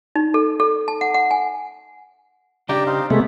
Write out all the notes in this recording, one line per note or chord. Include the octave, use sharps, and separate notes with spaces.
D#4
A4
A4
A5
F#5
F#5
G#5
C#3 D4 G4 D5 G5 A#5
C4 D#4 F5
C3 G#3 A3 B3 E5